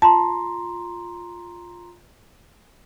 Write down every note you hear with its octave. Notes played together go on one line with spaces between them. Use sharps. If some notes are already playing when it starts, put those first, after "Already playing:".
F4 A5 A#5 C6